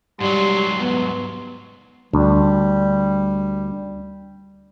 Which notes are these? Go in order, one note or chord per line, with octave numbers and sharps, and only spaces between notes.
G#2 F#3 G3 C6
B3
D2 G3